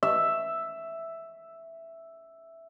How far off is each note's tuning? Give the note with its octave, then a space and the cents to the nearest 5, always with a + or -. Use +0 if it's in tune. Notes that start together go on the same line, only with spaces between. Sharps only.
E5 +0